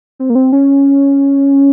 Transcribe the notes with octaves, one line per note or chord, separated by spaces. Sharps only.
C4
A#3
C4
C#4